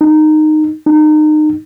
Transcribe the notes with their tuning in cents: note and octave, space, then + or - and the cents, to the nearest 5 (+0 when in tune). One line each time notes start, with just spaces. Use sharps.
D#4 -15
D#4 -30